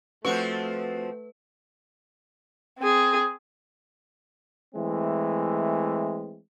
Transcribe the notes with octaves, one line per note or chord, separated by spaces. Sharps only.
F3 A3 C4 F#4 B4 C5 F#5 C#6
C4 G#4
E3 G#3 A3 C4